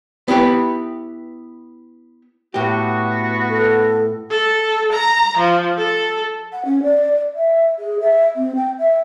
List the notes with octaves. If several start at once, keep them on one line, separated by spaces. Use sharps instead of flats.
B3 E4 G4 B4
A2 B3 F#4 G4
A4
A4
A#5
F3
A4
F#5
C#4
D5
E5
G#4
E5
C4
G5
E5